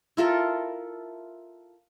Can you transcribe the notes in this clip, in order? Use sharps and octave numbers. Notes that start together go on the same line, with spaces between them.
E4 F4 A4 A#4